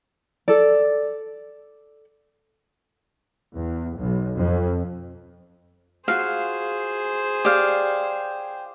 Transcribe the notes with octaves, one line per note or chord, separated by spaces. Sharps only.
A4 D5
E2
B1
F2
F4 F#4 G#4 C5 F5
G4 D5 F5